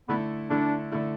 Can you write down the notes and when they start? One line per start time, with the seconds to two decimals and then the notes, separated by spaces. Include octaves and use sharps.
0.08 D3 A3 B3 E4
0.50 D3 A3 D4 E4
0.92 D3 A3 E4